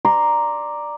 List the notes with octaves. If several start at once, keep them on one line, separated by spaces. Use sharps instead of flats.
D5 A#5 C6